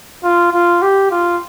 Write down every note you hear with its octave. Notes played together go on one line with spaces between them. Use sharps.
F4
F4
G4
F4